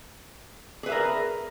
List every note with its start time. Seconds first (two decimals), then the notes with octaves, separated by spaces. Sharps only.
0.83 G#4
0.86 B4
0.89 E5
0.92 A#4